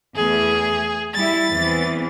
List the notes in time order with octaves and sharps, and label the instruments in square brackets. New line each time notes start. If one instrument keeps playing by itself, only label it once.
[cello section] E2 A3 [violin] G#4
[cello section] G3 E4 [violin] A6
[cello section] E2 E3 C4